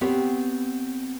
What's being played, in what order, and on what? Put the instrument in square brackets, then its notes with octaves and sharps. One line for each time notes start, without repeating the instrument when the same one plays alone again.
[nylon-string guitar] B3 C4 G4 B4 C#5